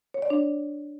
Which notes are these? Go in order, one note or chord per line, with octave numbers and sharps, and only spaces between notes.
C#5
D5
D4